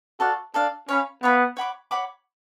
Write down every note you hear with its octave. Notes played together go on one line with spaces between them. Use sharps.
F#4 A4 D5 F5
D4 A4 D5 F5
C#4 C#5 F5 B5
B3 C#5 F5 B5
C#5 F#5 B5 D6
C#5 F#5 B5 D6